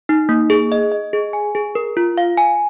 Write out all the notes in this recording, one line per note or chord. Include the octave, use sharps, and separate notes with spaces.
D#4
A#3
G#4
D#5
D#5
G#4
G#5
G#4
A#4
F4
F5
G#5